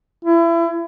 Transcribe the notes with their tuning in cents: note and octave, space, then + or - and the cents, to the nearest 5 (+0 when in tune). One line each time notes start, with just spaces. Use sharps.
E4 +30